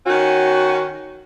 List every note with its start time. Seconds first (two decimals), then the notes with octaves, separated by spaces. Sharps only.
0.07 D#3 C#4 F#4